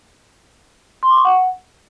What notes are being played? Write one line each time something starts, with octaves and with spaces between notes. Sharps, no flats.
C6
D6
C#6
F#5